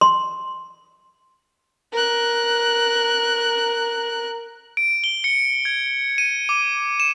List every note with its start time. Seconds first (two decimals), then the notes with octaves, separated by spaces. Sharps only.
0.01 C6
1.92 A#4 F#6
4.77 D7
5.04 G7
5.24 C#7
5.65 G#6
6.18 D#7
6.49 D6
7.00 E7